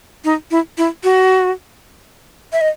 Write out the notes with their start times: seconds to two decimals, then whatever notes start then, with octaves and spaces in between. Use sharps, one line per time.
0.24 D#4
0.51 E4
0.78 E4
1.03 F#4
2.53 E5
2.61 D#5